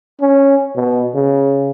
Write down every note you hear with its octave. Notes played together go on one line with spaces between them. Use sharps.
C#4
B2
C#3